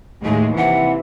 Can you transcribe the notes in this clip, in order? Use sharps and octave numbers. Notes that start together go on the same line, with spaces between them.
D#2 A2 G#3 A3
C3 E3 E4 F#5